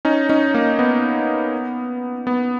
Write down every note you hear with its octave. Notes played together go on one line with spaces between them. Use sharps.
C#4 D#4
C#4 D#4
A#3
B3
B3